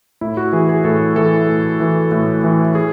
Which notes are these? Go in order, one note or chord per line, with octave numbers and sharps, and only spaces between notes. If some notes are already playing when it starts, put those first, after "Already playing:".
A2 E4
F#4
E3 G#4
G#4
A2 A4
E3 A4
A2
E3
A2
E3
G#4